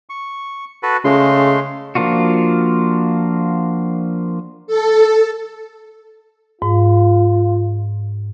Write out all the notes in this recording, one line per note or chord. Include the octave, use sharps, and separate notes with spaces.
C#6
F#4 A4 B4
C#3 G#3 A3 C6
F3 A#3 D4 F4 F#4
A4
G#2 F4